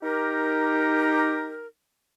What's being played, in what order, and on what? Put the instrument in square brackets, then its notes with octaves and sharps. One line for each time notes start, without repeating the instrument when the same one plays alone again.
[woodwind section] D#4 G4 A#4